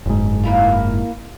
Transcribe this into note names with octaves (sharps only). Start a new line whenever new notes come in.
F#1 G#2
A#3 E4 F4